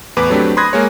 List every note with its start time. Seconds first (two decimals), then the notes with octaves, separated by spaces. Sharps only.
0.17 E2 A2 B4 D6
0.30 F#3 A3 C4 D4 G4 B4
0.57 B5 C6 D#6 F#6 G#6 A#6
0.73 G#3 A#3 G#4 C#5